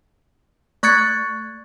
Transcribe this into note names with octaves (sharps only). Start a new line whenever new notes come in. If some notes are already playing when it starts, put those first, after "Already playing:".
A3 C#6 F#6 G#6 A6 C#7